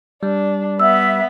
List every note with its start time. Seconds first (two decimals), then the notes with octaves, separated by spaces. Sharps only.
0.23 G3 D4
0.79 B3 E5 E6